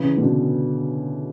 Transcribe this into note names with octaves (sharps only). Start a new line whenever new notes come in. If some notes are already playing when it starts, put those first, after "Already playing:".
Already playing: C#3 E3
B2 D3